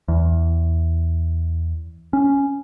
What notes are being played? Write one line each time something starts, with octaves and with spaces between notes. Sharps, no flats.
E2
C#4